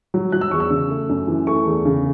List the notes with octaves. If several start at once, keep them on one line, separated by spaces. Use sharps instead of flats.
F#3
F#3 F#6
E6
E2 C#6
E6
C#3
A3
F#2
E3
A3 C#6
E2
C#3